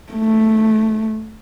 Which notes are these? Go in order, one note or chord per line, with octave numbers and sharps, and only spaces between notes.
A3